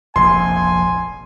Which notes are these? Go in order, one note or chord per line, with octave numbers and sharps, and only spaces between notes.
F1 A#1 G#5 C6